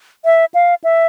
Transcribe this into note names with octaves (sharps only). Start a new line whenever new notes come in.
E5
F5
E5